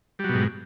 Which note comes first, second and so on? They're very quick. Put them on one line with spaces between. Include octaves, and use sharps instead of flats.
G3 F#3 B2 G#2